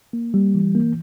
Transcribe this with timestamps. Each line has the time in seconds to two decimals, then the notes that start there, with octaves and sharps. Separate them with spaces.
0.13 A#3
0.34 G3
0.55 E3
0.75 A#3